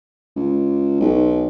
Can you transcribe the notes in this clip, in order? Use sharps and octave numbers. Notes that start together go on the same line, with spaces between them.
C#2
B1